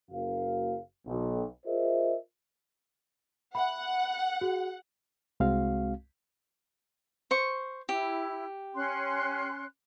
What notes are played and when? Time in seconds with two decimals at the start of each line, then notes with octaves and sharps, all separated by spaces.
0.11 F#1 F#2 A#3 F#4 F5
1.07 B1
1.66 F4 G#4 A#4 C5 D#5 E5
3.55 E5 F#5 B5
4.41 F#4 G#4
5.40 C2 G#3 C4 F#4 F5
7.31 C5 C#6
7.89 E4 G4
8.75 C#4 C6 F#6